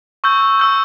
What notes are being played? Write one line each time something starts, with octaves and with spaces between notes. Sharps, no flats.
C#6 E6 G6
C#6 E6 G6